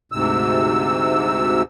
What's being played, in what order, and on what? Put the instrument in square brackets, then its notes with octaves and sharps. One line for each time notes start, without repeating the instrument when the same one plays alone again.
[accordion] D2 G#2 C3 E6